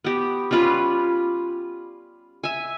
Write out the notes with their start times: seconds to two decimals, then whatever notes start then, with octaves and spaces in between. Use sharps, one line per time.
0.04 B3 G4
0.51 G3 C#4 F4 B4
2.44 E5 G#5